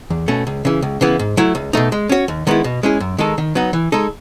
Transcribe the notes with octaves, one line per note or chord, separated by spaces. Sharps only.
E2
B2 A3 C#4
C#2
C#3 E3
C#2
C#3 E3 B3 E4
G#2
F#3 A3 E4
C#2
B2 A3 D#4
G#3
C#4 F#4 C#5
D#2
D#3 G#3 B3 E4
B2
G#3 C#4 E4 G#4
F#2
D#3 G#3 D#4 A4
D#3
F#3 B3 D#4
E3
G#3 D#4 A4